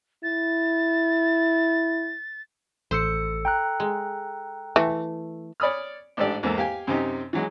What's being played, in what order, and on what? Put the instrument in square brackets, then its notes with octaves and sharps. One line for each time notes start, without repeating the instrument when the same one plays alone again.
[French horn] E4 [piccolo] A6
[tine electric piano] A1 [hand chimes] A4 E6 C#7 [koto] C5
[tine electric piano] G5 A#5 F#6
[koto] G#3
[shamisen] E3 [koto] A3
[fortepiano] C#5 D5 B5 D#6 F6
A1 G#2 D4 G4 A4 D5
E2 G#2 A#3 A4
G4 F5 G#5
F#2 C3 D#4 G4
E3 F#3 G#3